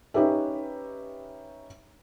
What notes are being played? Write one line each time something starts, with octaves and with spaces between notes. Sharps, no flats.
C#4 D#4 G4 B4 E5